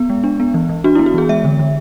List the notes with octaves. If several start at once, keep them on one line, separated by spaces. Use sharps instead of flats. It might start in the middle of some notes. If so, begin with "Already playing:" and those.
Already playing: B3
G#3
D4
B3
E3
E3
D4 F#4
B3 E4
F#4
E3 G#4
G#3 E5
D3
D3